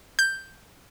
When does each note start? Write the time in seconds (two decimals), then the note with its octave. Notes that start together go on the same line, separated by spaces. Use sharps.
0.19 G6